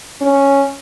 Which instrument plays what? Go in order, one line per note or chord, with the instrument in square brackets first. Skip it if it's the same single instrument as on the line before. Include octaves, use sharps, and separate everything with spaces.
[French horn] C#4